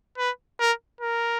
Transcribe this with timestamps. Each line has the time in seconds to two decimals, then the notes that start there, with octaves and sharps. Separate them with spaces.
0.18 B4
0.60 A#4
1.01 A#4